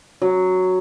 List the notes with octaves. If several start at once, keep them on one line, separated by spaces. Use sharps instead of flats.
F#3